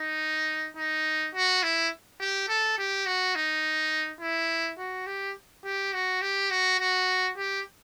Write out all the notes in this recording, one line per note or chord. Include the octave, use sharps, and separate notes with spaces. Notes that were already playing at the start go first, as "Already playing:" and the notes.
Already playing: D#4
D#4
F#4
E4
G4
A4
G4
F#4
D#4
E4
F#4
G4
G4
F#4
G4
F#4
F#4
G4